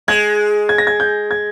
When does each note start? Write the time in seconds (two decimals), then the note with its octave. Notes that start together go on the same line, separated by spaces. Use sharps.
0.08 G#3 G#6
0.69 G#6
0.78 A#6
0.87 G#6
1.00 G6
1.31 G#6